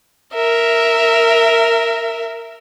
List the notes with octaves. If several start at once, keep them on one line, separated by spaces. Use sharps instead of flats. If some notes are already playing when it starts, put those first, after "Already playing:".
A#4 E5